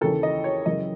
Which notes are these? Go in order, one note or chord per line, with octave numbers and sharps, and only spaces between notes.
D#2 C#3 E3 A4
D#5
C#5
F#2 C#3 E3 D#5